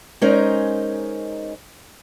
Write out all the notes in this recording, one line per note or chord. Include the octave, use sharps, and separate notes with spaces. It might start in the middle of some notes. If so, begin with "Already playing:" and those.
G#3 C#4 D#4 A#4 C5